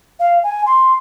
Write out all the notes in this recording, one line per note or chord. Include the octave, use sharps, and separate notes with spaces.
F5
G#5
C6